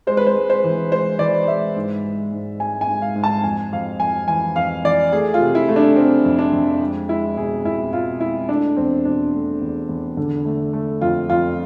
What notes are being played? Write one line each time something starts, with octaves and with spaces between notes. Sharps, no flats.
G#3 C5
B4
C5
G#3
C5
E3
G#3 C5
E3 D5
G#3 E5
G#2
G#3
G#2
G#3 G#5
G#5
G#2
F5
G#2
A5
F2 G#5
F2 F5
F2 G#5
E3 G#5
F2 F5
E3 D5
A3 G#4
F4
C3
E4
A3
D4
A3 C4
F2
D4
F2
G#3
G#3 E4
B2 G#4
B2 E4
B2 F4
G#3 E4
A3 D4
E2 C4
B2 D4
A3
E2
E2
D3
A3
A3
F2 F4
F2 F4